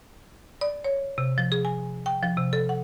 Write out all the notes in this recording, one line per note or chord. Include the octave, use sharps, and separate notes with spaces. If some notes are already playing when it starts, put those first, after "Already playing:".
D5
C#5
C3
F3
G#4
G#5
G5
F3
C3
A4
F#5